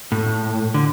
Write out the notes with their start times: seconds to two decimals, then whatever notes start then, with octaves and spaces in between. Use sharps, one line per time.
0.12 A2
0.74 D3